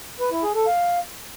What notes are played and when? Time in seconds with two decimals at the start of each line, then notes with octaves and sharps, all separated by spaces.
0.20 B4
0.31 E4
0.43 G#4
0.55 A4
0.67 F5